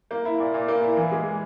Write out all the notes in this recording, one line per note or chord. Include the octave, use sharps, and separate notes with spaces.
A#3
E4
A#2
A#2
A#3
E4
E3
G#3